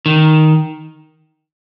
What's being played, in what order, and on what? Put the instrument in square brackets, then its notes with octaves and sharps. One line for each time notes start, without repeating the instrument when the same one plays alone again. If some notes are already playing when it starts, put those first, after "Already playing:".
[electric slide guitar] D#3